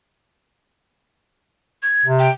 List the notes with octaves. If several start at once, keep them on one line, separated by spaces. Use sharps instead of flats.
G#6
C3
G5